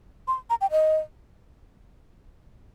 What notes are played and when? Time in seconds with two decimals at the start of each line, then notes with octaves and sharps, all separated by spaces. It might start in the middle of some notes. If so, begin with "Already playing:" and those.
0.28 C6
0.50 A#5
0.61 G5
0.71 D#5